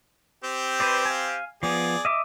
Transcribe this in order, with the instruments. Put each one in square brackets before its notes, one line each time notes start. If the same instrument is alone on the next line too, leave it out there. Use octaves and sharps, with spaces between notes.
[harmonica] C4 G4
[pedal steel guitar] B4 C5 D5
F5 G#5
[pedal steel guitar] F3 B3 [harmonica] G#4 D5
[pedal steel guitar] D#5 E5 D6